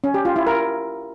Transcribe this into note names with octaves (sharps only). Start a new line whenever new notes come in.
C#4
G4
F4
E4
A#4